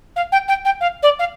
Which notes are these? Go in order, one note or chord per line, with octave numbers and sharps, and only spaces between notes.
F5
G5
G5
G5
F5
D5
F5